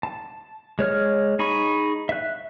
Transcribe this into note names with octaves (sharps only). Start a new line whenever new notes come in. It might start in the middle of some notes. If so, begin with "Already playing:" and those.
A5
G#3 C#5 F6
D#4 G#4 B5 C#6
E5 F#6